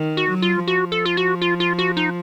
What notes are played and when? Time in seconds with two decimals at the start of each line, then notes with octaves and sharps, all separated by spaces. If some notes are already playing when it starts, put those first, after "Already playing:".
Already playing: D#3
0.17 F#4
0.30 F#3
0.42 F4
0.67 F3 F#4
0.92 A4
1.06 F4
1.17 F#4
1.42 F4
1.60 F4
1.79 F#4
1.97 D#4